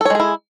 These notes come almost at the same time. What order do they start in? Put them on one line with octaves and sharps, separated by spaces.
A4 C#5 G#3 G#4 E4